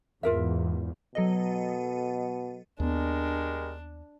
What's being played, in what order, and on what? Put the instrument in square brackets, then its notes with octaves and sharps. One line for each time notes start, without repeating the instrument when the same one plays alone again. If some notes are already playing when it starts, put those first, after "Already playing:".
[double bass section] E2 G#2 [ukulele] F4 A#4 E5
[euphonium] B2 [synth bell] F#3 A4 D#5
[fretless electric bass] D#2 B3 [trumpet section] G#3 G4 A#4 [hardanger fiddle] D4